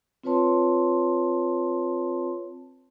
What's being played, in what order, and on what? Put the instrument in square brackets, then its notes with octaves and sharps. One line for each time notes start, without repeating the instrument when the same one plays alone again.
[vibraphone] C4 F4 B4 C#5 A5 C6